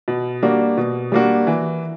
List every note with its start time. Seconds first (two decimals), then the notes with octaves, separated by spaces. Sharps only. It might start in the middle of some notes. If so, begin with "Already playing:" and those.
0.08 B2
0.43 G3 A#3 D4 F#4
0.77 B2
1.12 G3 A#3 D4 F#4
1.47 E3